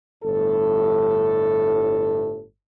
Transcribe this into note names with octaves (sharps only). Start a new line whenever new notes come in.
G1 A2 A4